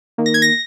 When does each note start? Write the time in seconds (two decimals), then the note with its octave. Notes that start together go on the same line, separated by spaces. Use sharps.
0.18 D#3 A#3
0.26 A#6
0.34 G#6
0.42 A#6